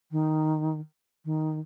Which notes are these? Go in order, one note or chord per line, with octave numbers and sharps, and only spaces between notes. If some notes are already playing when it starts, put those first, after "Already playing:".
D#3
D#3